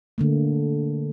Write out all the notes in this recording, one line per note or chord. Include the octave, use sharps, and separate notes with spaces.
D3 A3 A#3